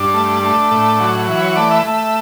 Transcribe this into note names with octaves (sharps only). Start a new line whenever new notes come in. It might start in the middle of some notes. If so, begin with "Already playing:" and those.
Already playing: G2 D4
A3
A3
A2
F#3
E3
C#5
A3 D5
E5
A3